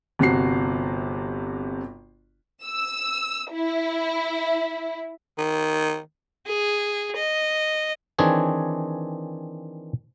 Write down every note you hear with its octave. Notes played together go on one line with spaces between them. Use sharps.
G1 C3 F#4 C7
E6
E4
D#3
G#4
D#5
D#3 E3 C4 D4 G#4 C#5